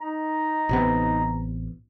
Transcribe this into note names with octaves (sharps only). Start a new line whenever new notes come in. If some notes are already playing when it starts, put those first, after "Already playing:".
D#4 A#5
A1 C3 B3